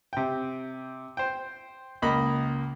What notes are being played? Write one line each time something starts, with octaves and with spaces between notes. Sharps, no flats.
C3 G5
C5 G5
C#2 A#3 D#5 B5